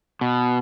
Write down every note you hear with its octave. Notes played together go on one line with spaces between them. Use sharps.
B2